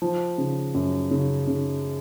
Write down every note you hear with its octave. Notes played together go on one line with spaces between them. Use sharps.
F3
C#3
F#2
C#3
C#3